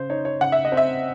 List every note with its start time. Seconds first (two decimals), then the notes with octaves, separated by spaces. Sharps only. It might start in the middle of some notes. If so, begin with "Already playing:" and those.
Already playing: C#3 C5
0.10 D#4 C#5
0.25 C#5
0.40 C#3 F#5
0.52 E5
0.65 D#5
0.72 C4
0.77 E5